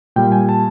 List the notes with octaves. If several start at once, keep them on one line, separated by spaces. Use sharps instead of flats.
A#2 G3 G5
G#5
A5